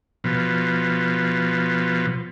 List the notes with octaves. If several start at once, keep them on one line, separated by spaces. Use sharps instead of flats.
B2 F3